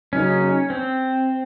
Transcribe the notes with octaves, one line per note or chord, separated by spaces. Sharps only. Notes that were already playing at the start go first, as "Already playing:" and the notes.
C#3 F#3 A#3 C#4 D#4
C4